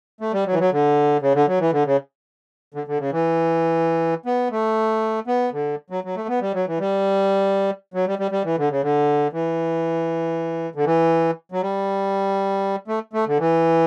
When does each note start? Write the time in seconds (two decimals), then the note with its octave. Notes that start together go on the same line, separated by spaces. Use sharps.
0.21 A3
0.33 G3
0.46 F#3
0.53 E3
0.59 F#3
0.72 D3
1.22 C#3
1.35 D3
1.48 F#3
1.60 E3
1.72 D3
1.85 C#3
2.74 D3
2.87 D3
2.99 C#3
3.12 E3
4.26 B3
4.51 A3
5.27 B3
5.53 D3
5.90 F#3
6.04 F#3
6.16 A3
6.28 B3
6.41 G3
6.54 F#3
6.67 E3
6.79 G3
7.94 F#3
8.07 G3
8.19 G3
8.31 G3
8.45 E3
8.57 D3
8.70 C#3
8.82 D3
9.33 E3
10.75 D3
10.85 E3
11.52 F#3
11.62 G3
12.88 A3
13.13 A3
13.27 D3
13.39 E3